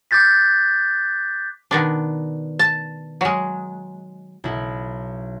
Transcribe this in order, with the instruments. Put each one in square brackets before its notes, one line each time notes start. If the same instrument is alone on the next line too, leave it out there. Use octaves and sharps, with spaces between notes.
[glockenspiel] D6 F#6 G6 A6 B6
[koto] B2 D#3 D4
A5
F#3 G#3
[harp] B1 E4